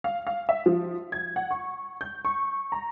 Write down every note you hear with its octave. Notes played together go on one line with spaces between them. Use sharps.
F5
F5
E5
F3
G#6
F#5
C#6
G6
C#6
A#5